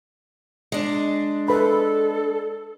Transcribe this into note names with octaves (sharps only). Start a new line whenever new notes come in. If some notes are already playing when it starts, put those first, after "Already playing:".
G#3 D4
A4 B4 B5